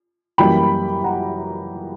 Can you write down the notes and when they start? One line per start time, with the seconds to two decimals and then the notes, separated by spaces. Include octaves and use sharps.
0.38 F#2 E3 G3 A#3 G5 B5
1.04 F#5 A#5